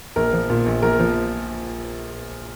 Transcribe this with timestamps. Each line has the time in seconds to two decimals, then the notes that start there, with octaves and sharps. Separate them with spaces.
0.16 A#1 A#4
0.33 F3
0.50 A#2
0.66 A#1
0.82 A#1 A#4
0.99 F3